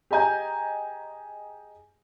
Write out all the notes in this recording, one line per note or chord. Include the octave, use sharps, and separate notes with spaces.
G4 G#4 D#5 G#5 A#5 G6